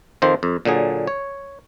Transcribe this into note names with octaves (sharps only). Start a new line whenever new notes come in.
F2 D#3 F3 C5
F2
A#2 D3 F#3 G#4
C#5